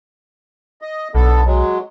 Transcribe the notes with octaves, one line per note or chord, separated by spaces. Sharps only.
D#5
B1 D3 B3 A4
F#3 G#3